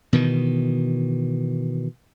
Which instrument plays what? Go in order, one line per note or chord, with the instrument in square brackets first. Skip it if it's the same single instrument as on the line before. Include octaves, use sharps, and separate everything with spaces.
[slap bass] B2 D#3 E3